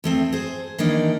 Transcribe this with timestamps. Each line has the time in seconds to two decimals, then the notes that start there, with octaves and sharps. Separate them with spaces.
0.04 E2 A3 C4
0.32 G#4 C5
0.78 D#3 E3 A#3 D4 D#4